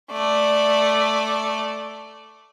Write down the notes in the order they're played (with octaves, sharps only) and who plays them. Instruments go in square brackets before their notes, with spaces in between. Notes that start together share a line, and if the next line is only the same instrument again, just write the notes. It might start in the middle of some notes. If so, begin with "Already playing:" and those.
[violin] A3 D5